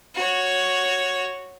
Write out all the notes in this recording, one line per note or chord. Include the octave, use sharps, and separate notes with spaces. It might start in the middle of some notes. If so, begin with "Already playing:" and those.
F#4 C#5